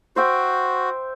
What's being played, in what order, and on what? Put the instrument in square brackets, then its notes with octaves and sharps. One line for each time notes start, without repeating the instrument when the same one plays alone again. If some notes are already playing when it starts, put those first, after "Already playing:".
[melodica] F#4 [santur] C5 E5 G5